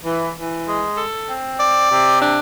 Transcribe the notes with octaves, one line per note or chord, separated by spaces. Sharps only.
E3
E3
G#3
A4
C4
D5
C3
D4